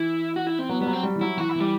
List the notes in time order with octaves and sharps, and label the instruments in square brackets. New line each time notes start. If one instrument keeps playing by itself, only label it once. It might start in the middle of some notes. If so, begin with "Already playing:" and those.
Already playing: [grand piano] E3 [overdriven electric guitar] E4
[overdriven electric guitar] F#4
E4
C4
[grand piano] F#3 [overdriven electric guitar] B3
[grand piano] G3 [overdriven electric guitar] B3
[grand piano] F#3
[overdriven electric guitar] C4
[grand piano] G3
E3
[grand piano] F#3 [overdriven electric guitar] E4
[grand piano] E3 [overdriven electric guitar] F#4
[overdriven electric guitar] E4
[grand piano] E3 [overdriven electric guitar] G3